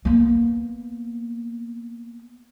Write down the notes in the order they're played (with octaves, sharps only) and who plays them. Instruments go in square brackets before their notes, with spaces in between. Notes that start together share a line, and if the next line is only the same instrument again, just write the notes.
[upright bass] A#3 B3